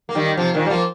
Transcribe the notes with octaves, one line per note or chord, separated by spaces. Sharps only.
A#3
D#3 G3
C3 F3
A#2 D#3
G3
F3 A#3